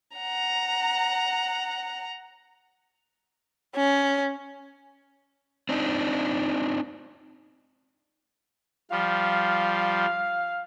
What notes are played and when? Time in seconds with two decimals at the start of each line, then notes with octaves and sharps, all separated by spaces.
0.17 F#5 A#5
3.76 C#4
5.69 C4 D4 D#4
8.91 F3 G3 F5